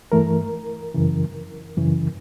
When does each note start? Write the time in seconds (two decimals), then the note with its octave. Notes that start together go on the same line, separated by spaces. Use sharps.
0.12 G2 E3 A3 A#4
0.94 F#2 C#3 E3
1.77 F#2 C#3 E3